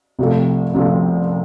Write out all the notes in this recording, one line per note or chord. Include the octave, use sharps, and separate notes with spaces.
C2 C3 F3 A3 C4
C2 C3 F3 A3 C4